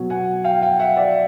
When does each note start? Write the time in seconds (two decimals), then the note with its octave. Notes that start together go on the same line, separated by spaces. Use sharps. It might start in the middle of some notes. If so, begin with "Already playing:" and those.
Already playing: B2 F#3
0.10 F#5 G#5
0.44 F5 G5
0.62 F5 G5
0.80 E5 F#5
0.97 D5 E5